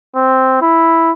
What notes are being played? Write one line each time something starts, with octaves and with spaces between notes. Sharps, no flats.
C4
E4